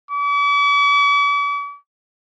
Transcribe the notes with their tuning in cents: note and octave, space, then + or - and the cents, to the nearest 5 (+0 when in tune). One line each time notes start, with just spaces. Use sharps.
D6 -45